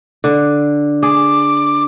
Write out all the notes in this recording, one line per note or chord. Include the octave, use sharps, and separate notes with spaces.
D3
G#4 D6